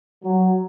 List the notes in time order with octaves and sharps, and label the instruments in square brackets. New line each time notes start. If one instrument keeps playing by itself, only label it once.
[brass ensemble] F#3